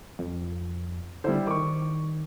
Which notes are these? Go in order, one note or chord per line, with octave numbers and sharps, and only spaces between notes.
F2
D3 G3 E4 C5
D#3 C#6 D6